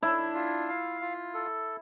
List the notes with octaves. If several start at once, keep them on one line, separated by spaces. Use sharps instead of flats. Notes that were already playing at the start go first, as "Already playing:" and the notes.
D4 E4
F4
F5
F4
A4